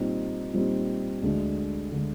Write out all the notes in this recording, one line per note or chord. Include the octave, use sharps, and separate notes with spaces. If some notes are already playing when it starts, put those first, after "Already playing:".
Already playing: A#2 G3 C4 D#4
A#2 G3 C4 D#4
D2 D3 G#3 D4
D3 G#3 D4